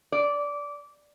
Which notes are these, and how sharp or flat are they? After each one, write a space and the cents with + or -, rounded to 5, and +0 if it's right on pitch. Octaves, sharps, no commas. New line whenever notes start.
D5 -15